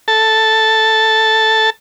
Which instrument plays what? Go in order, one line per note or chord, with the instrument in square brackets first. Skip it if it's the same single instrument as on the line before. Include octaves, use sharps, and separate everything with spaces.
[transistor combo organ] A4 A5